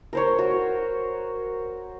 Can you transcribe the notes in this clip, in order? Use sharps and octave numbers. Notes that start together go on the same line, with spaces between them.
A#4 C5 C#5
F#4